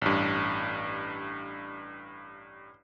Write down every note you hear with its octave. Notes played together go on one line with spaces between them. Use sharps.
A1 G2